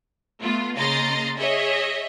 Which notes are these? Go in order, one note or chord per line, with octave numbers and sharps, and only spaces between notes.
A3 B3 F4
C#3 A#3 D#5 A#5 C6 A6
G#4 C#5 D#5 E5